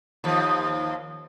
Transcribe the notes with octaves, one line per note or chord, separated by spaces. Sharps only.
D#2 F3